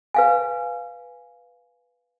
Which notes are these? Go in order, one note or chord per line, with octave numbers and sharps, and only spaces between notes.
B4 F5 G#5